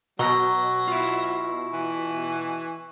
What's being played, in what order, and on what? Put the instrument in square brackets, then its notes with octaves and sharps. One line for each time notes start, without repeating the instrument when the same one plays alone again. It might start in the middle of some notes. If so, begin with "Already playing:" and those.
[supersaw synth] B2 [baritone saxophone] F#3 [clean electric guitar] A#5 [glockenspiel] C#6 E6 A#6
[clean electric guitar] E4 F4
[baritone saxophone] E3